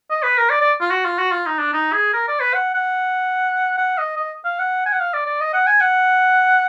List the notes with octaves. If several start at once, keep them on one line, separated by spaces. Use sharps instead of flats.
D#5
B4
A#4
D5
D5
F4
F#4
F4
F#4
F4
D#4
D4
D#4
G#4
A#4
D5
B4
F#5
F#5
F#5
D#5
D#5
F5
F#5
G#5
F#5
F5
D5
D5
D#5
F#5
G#5
F#5